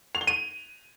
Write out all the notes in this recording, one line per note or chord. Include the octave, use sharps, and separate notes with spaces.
F7
G7
D#7